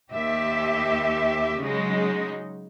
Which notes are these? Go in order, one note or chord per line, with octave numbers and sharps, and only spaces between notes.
D#2 G4 E5
C#3 F#3 G#3 D#4